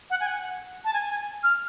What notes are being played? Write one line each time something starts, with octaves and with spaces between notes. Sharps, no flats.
F#5
G#5
F#5
A5
G#5
G#5
F6